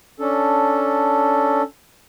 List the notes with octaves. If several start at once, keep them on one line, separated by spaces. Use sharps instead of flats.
C#4 D4 A4